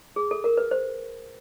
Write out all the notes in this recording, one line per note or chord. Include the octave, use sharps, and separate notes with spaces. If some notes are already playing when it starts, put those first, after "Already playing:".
G#4
A4
A#4
B4
C5